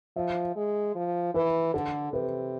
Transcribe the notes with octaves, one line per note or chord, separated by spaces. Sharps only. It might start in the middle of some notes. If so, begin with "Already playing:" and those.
F3 E5
G#3
F3
E3 B4
D3 A4
C3 B4